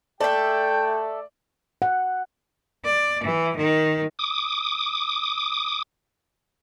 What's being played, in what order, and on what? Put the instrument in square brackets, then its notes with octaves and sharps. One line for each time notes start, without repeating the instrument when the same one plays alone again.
[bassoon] A3 [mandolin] A4 E5 [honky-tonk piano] D5 [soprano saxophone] G5
[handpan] F#5
[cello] D5
E3
D#3
[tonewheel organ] D6 D#6